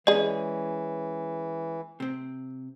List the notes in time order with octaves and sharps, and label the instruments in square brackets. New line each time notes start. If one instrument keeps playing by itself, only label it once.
[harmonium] E3 [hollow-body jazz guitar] G#3 C#4 [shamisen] G#4 D#5 [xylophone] D5
[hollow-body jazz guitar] C3 C4